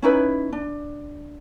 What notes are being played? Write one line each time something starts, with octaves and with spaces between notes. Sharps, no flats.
C#4 D#4 E4 B4
D4